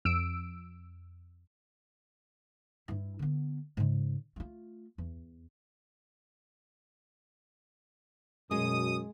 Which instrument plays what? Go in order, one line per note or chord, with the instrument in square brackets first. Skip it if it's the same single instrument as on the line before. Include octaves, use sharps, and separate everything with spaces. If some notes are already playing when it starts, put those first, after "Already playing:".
[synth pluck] F2 E6 D7
[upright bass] G2 E4
D3 B3
G#2 C#3
A3 F4
E2
[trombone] F#2 [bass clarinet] B2 [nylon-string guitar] G#3 [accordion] D#6